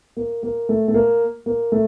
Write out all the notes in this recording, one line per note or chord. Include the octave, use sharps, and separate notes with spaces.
A#3
A#3
A3
A3
A#3
A#3
A3